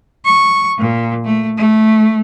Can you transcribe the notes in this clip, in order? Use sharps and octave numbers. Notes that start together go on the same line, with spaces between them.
C#6
A#2
A3
A3